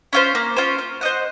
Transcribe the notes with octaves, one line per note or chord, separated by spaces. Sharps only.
C#4 F4 C5
A#3
C#4 F4 C5
F4
C5 D#5 F#5